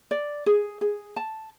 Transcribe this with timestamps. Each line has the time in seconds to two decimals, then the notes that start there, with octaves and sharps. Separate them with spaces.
0.11 D5
0.46 G#4
0.81 G#4
1.16 A5